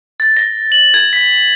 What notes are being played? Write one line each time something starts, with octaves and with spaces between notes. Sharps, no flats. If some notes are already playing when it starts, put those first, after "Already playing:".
A6
A#6
F#7
G#6
B6